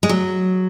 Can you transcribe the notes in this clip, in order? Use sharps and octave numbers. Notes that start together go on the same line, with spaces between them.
G#3
F#3